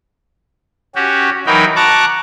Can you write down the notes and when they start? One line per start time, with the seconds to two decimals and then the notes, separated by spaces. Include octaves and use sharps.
0.95 C#4 F#4 G4
1.47 E3 F#3 D#4 A#4 G5 B5
1.76 A5 A#5 C#6 D6 F#6